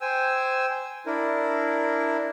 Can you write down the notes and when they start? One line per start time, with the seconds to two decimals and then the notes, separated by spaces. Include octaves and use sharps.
0.01 C5 G5 G#5 E6
1.06 D4 E4 A#4